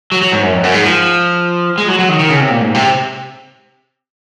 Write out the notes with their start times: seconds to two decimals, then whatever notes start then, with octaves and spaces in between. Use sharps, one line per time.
0.12 F#3
0.22 F#3
0.32 G#2
0.43 F#2
0.53 F2
0.63 F#2
0.74 G#2
0.84 F3
1.78 G#3
1.88 F#3
1.99 F#3
2.09 D#3
2.19 D#3
2.29 C#3
2.40 C3
2.50 A#2
2.61 G#2
2.75 C3